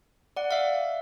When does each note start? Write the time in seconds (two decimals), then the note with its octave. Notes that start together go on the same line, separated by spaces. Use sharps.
0.36 D5 F#5
0.51 E5 F5